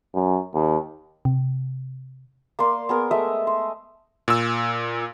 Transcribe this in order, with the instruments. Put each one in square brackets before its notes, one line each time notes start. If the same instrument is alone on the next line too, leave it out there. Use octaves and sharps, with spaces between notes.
[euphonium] F#2
D#2
[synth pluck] C3
[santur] A#3 D5 C6
B3 G#4 A#4
G#3 A3 D#5 E5
C6
[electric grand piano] A#2 E6